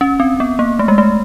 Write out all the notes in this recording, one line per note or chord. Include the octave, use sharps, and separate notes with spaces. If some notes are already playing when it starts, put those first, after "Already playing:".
C#4
C4
B3
A#3
A3
G#3
A3